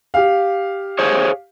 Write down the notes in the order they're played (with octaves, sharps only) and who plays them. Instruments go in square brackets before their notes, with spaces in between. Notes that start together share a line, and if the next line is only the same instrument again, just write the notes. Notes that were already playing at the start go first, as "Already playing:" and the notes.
[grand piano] G4 F5
[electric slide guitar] G#4 C5 C#5